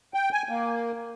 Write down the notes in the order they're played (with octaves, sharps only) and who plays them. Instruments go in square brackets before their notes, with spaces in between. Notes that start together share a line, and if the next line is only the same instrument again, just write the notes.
[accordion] G5
G#5
A#3